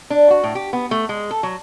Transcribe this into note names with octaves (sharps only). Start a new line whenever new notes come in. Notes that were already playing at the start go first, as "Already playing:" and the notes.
D4
F#4
A2
G4
B3
A3
G#3
A4
F#3